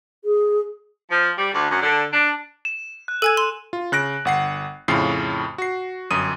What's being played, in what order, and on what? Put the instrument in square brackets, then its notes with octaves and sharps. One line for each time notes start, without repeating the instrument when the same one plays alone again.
[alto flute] G#4
[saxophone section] F3
G3
D2
F#2
D3
D4
[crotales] E7
F#6
[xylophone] A4 G#5 G#6 [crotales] E6 D#7
[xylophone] C6 [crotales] F#6
[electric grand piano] F4
C#3 F#6 A#6 D7
G1 F#5 C7
F2 A2 C#3 F4 C7
F#4 C7
G1 F#2 D#6 D#7